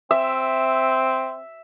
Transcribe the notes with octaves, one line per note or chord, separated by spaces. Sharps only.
C4 E5